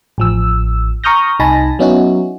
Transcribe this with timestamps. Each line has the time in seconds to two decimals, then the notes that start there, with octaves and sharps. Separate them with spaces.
0.18 A1 F3 E6
1.04 A#5 C#6 D#6 F6 G6 A#6
1.40 C2 D#4 G#5 A5 B5 A#6
1.79 F#3 B3 C#4 D#4 E4 F#4